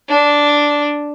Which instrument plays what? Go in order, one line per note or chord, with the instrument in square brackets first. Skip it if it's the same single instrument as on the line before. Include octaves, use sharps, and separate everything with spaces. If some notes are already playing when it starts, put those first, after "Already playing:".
[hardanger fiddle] D4